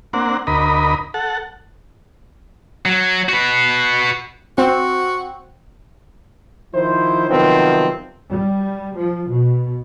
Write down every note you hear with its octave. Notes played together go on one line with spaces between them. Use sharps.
A#3 C4 D4 F#5
D2 A#4 D#5 B5
A4 F#5
F#3
F#4 B4
C4 F#4
D#3 F3 E4 C5
C3 D#3 F3 F#3 B3 C4
G3
F3
B2